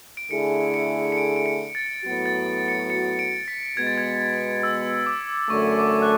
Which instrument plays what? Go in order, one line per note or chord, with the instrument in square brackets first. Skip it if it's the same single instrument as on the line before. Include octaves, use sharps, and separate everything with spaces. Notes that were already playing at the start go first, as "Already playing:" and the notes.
[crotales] D7
[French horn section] D3 A3 E4 G#4 [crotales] C#7
[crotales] C#7
C#7
D7
D7
C#7
A6
[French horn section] A2 F#3 B3 F#4
[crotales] A6
C#7
C#7
D7
B6
[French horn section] B2 G#3 B3 [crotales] G#6
[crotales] A6
G#6
E6
D6
[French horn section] F#2 D3 A3 [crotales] C#6
[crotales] D6
F#6